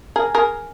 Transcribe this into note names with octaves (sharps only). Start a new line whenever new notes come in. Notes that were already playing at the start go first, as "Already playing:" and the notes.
G#4 A#4
G#4 A#4